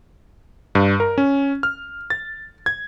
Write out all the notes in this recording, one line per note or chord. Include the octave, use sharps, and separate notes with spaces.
G2
A#4
C#4
F6
A6
G#6